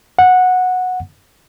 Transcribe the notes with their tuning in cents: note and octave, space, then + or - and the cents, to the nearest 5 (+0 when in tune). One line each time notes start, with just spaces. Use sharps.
F#5 -10